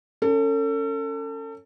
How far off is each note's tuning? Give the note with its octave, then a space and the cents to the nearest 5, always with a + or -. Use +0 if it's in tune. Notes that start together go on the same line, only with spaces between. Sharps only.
C#4 +0 A4 +35